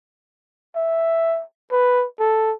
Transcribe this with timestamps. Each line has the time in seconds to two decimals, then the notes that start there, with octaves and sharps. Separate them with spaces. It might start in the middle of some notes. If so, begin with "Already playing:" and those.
0.76 E5
1.72 B4
2.20 A4